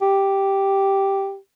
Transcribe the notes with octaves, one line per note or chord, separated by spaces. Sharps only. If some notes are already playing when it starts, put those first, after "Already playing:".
G4